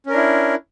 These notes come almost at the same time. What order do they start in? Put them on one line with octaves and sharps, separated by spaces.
C#4 A#4 D4 E4